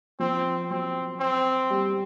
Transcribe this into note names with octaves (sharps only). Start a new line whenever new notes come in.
F3 C4
F#3 C4
C4
G3